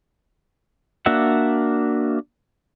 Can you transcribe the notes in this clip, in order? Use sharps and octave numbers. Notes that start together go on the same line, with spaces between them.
A#3 D4 F#4 E5 F#5